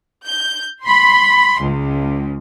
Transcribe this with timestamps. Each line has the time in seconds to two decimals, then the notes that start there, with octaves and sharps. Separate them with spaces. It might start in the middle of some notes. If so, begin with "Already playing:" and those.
0.25 G6
0.84 B5 C6
1.63 C#2